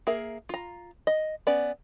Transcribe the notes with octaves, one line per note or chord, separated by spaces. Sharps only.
A#3 G#4 A#4 E5
F4 A#5
D#5
B3 C#4 D5